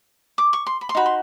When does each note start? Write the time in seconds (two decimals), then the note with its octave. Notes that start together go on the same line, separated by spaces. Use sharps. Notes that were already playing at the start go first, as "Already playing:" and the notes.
0.38 D6
0.53 C#6
0.67 C6
0.81 B5
0.89 C6
0.95 D#4 F#4 B5
1.06 C6